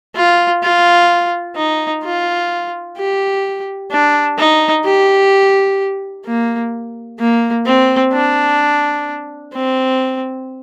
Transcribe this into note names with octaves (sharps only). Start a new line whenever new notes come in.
F4
F4
D#4
F4
G4
D4
D#4
G4
A#3
A#3
C4
D4
C4